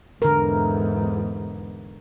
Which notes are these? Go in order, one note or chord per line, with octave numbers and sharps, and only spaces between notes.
E2 G#2 D3 A#4